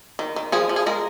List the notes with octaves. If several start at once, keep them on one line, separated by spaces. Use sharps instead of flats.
D#3
D#3
F3 G#4
F3
G#4
G#3 A#4